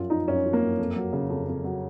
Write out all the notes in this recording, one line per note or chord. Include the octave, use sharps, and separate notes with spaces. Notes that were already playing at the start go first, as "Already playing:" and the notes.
Already playing: F#2 F3 F4
F3 D#4
F#2 C#4
F3
A#3
F#2
F2
F#3
C#3
F2
F2
F#3